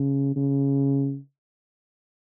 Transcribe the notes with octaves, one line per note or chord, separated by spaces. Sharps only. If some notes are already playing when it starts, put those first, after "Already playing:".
Already playing: C#3
C#3